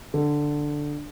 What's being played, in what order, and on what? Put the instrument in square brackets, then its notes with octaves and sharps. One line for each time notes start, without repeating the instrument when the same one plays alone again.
[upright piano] D3